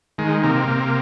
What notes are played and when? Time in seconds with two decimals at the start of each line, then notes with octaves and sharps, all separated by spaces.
0.18 D#3 G#3
0.44 C3 A#3
0.68 C3